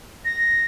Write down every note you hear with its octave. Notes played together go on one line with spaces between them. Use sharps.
A#6